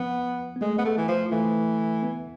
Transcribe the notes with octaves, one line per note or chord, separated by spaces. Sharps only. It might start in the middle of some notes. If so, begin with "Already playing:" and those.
Already playing: F3 B3
B3
G#3 A3
B3
A3
E3
F3
E3 A3
B3